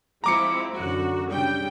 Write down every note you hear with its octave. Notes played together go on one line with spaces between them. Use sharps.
F3 G#3 C4 E4 A#5 D6 C#7
F#2 D3 F#4
C#3 G3 D4 G5